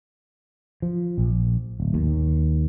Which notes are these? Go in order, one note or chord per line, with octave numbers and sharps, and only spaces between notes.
F3
A#1
D1
D#2